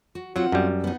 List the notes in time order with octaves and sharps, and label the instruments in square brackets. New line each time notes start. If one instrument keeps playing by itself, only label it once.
[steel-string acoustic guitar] F#4
[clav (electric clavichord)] F#3 [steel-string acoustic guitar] C4 F4 F#5
[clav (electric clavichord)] F#2 G3
[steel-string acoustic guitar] B3 D#4